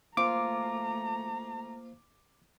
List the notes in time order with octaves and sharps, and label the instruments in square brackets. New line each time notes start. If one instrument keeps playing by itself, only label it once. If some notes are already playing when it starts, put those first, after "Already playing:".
[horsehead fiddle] A3 A#5 [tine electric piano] A#3 C5 [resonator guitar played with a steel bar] F4 [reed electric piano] D6